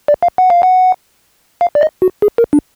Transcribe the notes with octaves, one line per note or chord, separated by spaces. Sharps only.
D5
F5
F#5
F5
F#5
F5
D5
D#5
F#4
G#4
A#4
D4